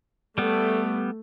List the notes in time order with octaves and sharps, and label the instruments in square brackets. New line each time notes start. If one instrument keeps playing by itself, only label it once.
[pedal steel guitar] G3 B3 [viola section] A3